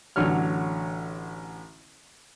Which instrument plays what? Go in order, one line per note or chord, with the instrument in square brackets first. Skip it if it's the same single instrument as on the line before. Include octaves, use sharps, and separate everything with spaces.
[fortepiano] A1 D3 F#3 C#5 F6